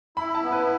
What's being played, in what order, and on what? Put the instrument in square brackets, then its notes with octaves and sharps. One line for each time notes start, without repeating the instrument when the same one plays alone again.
[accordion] E4 [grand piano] B5
[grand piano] A5
[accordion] B3
[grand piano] B4